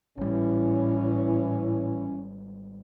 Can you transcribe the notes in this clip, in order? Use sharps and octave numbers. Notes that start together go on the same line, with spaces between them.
G#1 A2 E3 G3 C#4